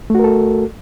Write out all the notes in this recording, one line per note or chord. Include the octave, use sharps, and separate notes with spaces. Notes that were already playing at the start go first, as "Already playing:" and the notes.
A3 F#4 A4 A#4